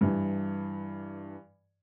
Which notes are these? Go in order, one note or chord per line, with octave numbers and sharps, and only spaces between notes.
G2 E3